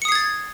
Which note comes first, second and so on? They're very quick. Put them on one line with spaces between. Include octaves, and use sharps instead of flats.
C#7 D#6 C7 G#6 A6